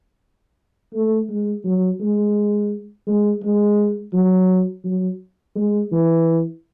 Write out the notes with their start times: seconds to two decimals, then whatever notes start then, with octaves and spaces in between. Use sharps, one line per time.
0.93 A3
1.29 G#3
1.65 F#3
2.00 G#3
3.07 G#3
3.43 G#3
4.14 F#3
4.84 F#3
5.55 G#3
5.92 E3